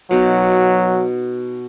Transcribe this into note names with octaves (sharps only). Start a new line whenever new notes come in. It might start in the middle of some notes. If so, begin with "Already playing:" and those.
B2 F#3 D#4